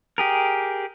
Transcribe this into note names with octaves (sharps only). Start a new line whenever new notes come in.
G4 G#4 A#4